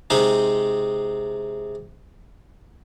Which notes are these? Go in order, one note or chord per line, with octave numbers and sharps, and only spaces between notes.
C3 G#3 C4 D#4 C5